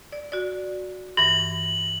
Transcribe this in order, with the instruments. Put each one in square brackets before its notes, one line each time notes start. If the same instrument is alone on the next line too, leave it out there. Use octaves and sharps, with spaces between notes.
[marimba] D5
F#4 D5
[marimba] G2 E3 A#6 [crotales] F#7